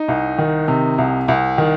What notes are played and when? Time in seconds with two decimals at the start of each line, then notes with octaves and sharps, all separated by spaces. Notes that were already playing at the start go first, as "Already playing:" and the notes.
Already playing: D#4
0.08 C2
0.38 D#3
0.68 C3
0.98 C2
1.28 C2
1.58 D#3